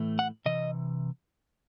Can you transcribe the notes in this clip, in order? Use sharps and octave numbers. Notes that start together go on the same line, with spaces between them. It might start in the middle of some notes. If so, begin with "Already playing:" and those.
Already playing: A2 E3 A3
F#5
C3 E3 D#5